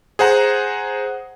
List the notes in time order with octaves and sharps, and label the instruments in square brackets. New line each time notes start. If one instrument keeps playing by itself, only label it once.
[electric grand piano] G#4 C5 F#5 A#5